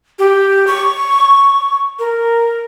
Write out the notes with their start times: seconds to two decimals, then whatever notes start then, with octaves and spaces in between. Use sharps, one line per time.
0.19 G4
0.67 C#6
1.99 A#4